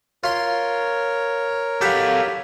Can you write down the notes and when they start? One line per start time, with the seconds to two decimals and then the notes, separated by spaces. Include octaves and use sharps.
0.24 F4 A#4 C#5 C6
1.81 G4 A4 F5 F#5 B5